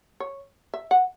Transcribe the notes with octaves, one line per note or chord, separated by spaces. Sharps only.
C#5
E5
F#5